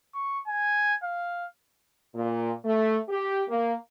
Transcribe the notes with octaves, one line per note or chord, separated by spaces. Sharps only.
C#6
G#5
F5
A#2
A3
G4
A#3